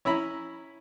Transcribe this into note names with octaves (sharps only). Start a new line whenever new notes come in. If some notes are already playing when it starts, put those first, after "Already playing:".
C#4 E4 A#5 B5